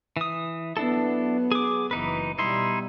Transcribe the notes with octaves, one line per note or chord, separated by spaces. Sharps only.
E3 D#6
F#3 B3 D4 E4 A4
G#4 D6
F#1 E3 D#4 B4
B2 G3 B3 D#4 E4 C6